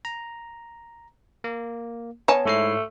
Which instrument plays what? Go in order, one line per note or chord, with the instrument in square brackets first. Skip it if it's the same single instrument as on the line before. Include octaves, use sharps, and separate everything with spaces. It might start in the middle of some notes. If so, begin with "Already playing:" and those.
[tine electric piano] A#5
A#3
[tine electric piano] B3 [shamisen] C#5 G#5 A5
[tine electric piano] G#2 E4 C7 [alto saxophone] A3